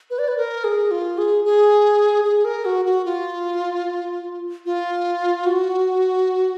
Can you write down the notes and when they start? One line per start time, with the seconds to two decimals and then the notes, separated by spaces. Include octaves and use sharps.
0.10 B4
0.19 D5
0.28 B4
0.37 A#4
0.64 G#4
0.91 F4
1.18 G#4
1.45 G#4
2.24 G#4
2.45 A#4
2.65 F#4
2.85 F#4
3.05 F4
4.66 F4
5.46 F#4